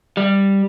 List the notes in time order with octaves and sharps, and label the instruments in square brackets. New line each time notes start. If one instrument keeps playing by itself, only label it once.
[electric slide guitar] G3